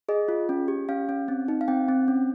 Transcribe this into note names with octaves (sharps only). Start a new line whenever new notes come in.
G#4 D#5
F4
C#4
G4
C#4 F5
C#4
C4
D#4
F5
C4 G5
C4
C#4